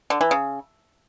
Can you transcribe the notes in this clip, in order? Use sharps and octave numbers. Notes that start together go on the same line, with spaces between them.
D3
E3
C#3